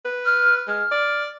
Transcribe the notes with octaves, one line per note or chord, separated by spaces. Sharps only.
B4
F6
G#3 F6
D5